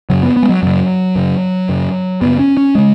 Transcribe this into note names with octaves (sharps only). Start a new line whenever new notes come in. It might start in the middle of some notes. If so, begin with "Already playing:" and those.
F#2 C#3 F#3
B3
B3
G#3
F#3
F#2 C#3 F#3
F#2 C#3
F#2 C#3
F#2 C#3 B3
C#4
C#4
C#3 G#3